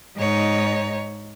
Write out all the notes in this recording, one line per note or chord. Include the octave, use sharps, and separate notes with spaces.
G#2 D#4 C#5